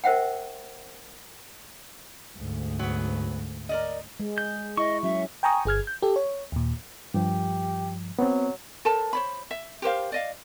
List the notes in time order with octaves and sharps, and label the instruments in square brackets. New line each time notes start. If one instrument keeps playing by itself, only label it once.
[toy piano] A#4 C5 E5 F#5 G5
[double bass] D2 G#2
[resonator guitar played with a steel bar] F#3 B3
A#4 D5 D#5
[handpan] G#3
[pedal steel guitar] G6
[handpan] E4 [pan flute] D#5 [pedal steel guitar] C#6
[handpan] F#3 C#4 [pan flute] E5
[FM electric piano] G5 G#5 A#5 C#6 D#6
G1 G#4 F6 G#6
G6
G4 A4
C#5
D#2 A#2
[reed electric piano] G2 F3 [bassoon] G4
[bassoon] F#3 [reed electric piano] B3 C4
[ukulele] A4 A#4 C5 A5
C5 C#5 B5
E5
G4 A#4 C5 F5
D5 D#5 F5